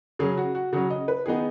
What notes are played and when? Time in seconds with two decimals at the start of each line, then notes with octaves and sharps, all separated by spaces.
0.19 C#3 F#3 C#4 G#4
0.37 F#4
0.55 F#4
0.73 C#3 F#3 C#4 F#4
0.90 D#5
1.08 B4
1.26 D#3 B3 D#4 G#4